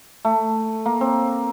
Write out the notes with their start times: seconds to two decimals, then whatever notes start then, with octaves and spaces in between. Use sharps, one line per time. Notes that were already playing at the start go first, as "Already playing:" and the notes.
0.25 A3
0.86 A#3
1.01 C4